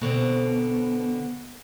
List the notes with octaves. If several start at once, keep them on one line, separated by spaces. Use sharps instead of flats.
B2 D3 C4